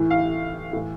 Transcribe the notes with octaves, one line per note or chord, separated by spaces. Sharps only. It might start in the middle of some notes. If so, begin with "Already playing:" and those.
Already playing: A2 E3
F5
A2 E3